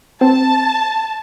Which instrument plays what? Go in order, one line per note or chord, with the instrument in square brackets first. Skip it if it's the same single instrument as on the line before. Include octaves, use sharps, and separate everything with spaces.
[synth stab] C4 [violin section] A5